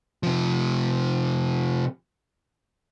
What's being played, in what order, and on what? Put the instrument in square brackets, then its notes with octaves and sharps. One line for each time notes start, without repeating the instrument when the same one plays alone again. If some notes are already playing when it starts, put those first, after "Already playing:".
[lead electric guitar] C3 F3